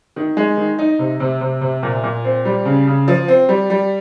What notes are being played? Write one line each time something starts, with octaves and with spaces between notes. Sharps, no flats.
D#3
G#3
D#3
D#4
C3
C3
C3
C3
A#2
A#2
C4
G3
C#3
C#3
F3
C4
G3
G3